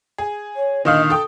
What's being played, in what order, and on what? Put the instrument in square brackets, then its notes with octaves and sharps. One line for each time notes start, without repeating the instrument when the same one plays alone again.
[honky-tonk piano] G#4
[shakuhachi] C#5
[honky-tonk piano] A#2 D3 F5 [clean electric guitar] D#3 [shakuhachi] D#5
[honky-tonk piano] A4 G5 [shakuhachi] D#6